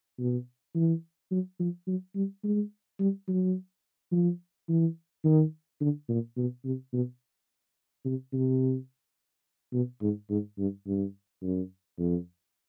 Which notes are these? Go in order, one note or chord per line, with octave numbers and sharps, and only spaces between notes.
B2
E3
F#3
F3
F#3
G3
G#3
G3
F#3
F3
E3
D#3
D3
A#2
B2
C3
B2
C3
C3
B2
G#2
G#2
G2
G2
F#2
F2